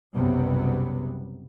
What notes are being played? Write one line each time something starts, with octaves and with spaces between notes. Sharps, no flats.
F#1 B1 C3 F#3 G3 B3